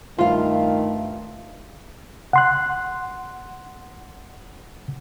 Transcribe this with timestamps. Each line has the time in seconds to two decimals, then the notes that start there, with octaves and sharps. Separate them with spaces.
0.18 G2 D#3 A3 F4 F5
2.33 F#5 C6 F#6